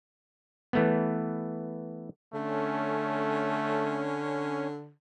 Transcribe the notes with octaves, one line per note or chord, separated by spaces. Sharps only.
E3 A3 B3
D3 A3 C#4